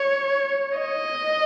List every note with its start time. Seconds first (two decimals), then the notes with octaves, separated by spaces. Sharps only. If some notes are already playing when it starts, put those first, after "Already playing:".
Already playing: C#5
0.78 D#5